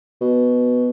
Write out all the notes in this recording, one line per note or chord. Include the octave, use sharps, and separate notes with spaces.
B2